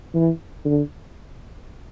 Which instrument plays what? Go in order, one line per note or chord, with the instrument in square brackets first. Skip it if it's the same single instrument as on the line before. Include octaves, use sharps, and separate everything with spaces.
[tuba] E3
D3